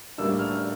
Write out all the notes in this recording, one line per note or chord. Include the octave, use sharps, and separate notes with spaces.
A2 G3 A#3 D4 E6
F6